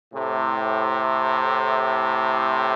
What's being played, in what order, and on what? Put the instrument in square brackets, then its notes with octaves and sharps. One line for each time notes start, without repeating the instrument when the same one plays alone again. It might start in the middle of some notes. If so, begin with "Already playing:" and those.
[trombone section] A2 C3